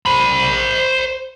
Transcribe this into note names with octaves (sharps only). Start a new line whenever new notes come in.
C5 B5